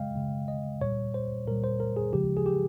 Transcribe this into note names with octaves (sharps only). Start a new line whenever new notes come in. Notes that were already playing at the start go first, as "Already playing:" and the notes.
Already playing: C#3 G#3 D#5 F5 G5
C#3 G#3
D#5
A#2 G3 C#5
C5
A#2 G3 A#4
C5
A#4
G#4
C#3 F3 G#3 G4
G#4
G4